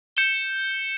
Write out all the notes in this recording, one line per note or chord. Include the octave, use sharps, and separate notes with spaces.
G6 C#7 E7 G7